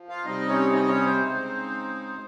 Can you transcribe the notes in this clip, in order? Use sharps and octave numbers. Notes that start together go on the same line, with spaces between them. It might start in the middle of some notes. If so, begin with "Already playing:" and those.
Already playing: F3
F4 F5
C3 G3 C4 D#4 D#5
C#4 C#5
D#4 D#5
C#4 C#5
C4 C5
C#3 G#3 D#4